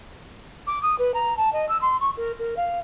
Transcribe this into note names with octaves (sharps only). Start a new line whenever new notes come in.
D6
D#6
B4
A#5
A5
D#5
E6
C6
C#6
A#4
A#4
F5